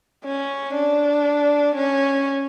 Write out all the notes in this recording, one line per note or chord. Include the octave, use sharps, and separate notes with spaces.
C#4
D4
C#4